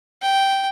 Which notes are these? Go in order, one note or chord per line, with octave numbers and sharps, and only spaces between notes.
G5